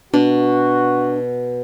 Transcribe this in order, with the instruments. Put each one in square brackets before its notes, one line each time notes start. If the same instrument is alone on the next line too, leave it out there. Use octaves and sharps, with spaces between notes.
[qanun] B2 [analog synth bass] D4 [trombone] F#4